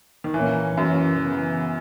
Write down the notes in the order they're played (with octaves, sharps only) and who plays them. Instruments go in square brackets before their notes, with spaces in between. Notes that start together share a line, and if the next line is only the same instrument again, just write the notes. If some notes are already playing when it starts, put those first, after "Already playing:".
[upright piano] D#3
[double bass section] A#2 A#3 C#4 [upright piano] E3
[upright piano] F#2 [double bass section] E3 A#3 C#4
[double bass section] C#3 E3 B3